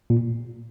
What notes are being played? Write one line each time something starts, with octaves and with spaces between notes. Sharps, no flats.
A#2